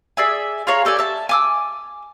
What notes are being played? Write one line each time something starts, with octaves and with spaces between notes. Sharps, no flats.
G#4 D5 E5 G#5
F4 G#4 C#5 A#5
G4 A4 D5 G#5
E5 A5
G#5 D6 E6